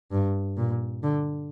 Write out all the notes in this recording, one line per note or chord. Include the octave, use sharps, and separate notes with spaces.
G2
A#2
D3